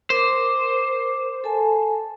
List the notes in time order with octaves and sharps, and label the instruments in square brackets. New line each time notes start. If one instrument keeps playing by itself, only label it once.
[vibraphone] A#4 D6 [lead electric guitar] C5
[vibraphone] A4 G#5 A5